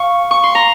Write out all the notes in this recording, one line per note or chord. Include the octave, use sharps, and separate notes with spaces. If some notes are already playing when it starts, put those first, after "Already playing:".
Already playing: F5 C#6
C#6
C6
A#5